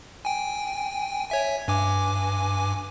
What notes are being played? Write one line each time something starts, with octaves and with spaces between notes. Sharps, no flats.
G5 G#5
C#5 E5 G#5
G2 G#5 D6